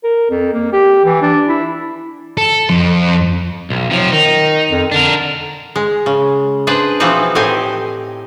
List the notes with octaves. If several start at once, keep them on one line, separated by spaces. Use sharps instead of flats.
A#4
F2
A#3
G4
E3
D4
E4
A4
F2
B1
C3 F3 F#3
D#3 D#4
F2
D3 D4 A#4
G#3
C#3
D4 G#4 B4 C5
B2 E3 F3 C4 D#4 B4
A2 C4 D#4 G4 G#5